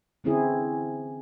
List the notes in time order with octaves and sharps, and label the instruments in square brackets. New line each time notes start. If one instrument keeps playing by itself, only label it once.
[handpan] D3 E3 C4 C#4 E4 G#4